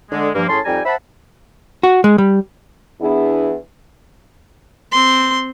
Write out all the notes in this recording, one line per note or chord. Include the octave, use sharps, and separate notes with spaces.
D3 G#3
G2 F3 A#3
A2 C#4 G#4 A5 C6
F2 G3 D#4 G5 G#5 A#5
C5 E5 F#5 A5 B5
F#4
G#3
G3
E2 B3 D4 E4 G#4
C4 C6